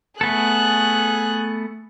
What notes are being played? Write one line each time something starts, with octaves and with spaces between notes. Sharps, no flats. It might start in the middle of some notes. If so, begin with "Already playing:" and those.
A3 B3 G#4 A4 F#6